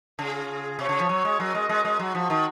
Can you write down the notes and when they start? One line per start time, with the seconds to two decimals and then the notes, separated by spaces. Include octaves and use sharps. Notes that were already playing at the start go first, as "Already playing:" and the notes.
0.19 C#3 C#4 F4 G#4
0.79 C3 C#4 F#4 C#5
0.89 C#3
0.99 F3
1.09 F#3
1.25 G#3
1.40 F#3 C#4 F#4 A#4 D#5
1.54 G#3
1.69 G#3
1.85 G#3
1.99 F#3 G#3 D#4 F#4
2.15 F3
2.30 D#3